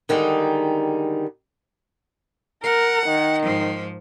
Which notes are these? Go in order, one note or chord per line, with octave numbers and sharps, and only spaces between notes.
D3 D#3 G3 G#3 D#4
A#4 F#5
D#3
G#2 F3